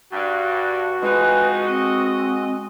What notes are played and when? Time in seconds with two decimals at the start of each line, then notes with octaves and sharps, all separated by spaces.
0.13 G2 F#4
1.02 F2 G#3 C4 D#4 G#4 B4 G#5
1.67 C4 D#5